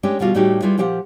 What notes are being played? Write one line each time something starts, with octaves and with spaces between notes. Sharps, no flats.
G#3 A3 C#4 D4 G4
D2 B2 D3 G3 F4 F#4
A2 G3 A3 D#4 F#4 G4
G3 E4 F4 G#4 B4
A#2 F3 G4 E5 F#5